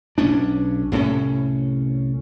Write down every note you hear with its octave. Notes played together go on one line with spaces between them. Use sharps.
B1 C#4 D4
C2 A2 G#3 C#4